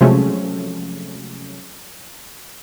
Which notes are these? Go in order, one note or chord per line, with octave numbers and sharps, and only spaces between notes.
C3 F3 F#3 G#3 A3 C#4